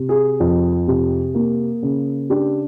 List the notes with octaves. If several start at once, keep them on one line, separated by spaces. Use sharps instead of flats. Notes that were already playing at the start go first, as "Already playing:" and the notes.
Already playing: C3
G#4
F2
C3
A#3
C#3
D4 G4